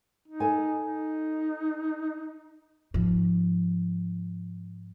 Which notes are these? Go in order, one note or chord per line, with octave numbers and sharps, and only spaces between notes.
D#4
A4 G#5
D#4
G#2 F3